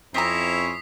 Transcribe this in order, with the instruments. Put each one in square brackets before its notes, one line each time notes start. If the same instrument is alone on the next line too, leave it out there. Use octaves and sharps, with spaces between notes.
[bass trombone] F2 [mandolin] C4 A#5 [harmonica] C#4 E4 [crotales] D#6 B6 C7